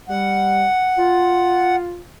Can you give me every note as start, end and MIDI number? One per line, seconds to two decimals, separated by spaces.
0.09 0.65 55
0.09 1.76 78
0.98 2.02 65